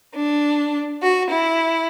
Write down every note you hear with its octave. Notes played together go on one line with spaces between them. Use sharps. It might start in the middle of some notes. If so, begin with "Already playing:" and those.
D4
F#4
E4